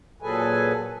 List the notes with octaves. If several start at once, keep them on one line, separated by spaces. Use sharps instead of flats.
A#2 F#3 G#4 A4 B4 G#5